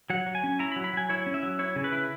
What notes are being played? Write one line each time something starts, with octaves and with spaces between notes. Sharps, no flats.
F#3 F#5
F#3
G#5
C#4
E4 A#5
B5
F#3
B5
F#3 G#5
E4 C#5
C#4
E5
F#3
E4 C#5
C#3
B4
E4